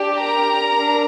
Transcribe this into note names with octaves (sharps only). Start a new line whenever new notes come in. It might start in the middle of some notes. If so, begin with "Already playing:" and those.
Already playing: D4 G4
A#4 A#5
D4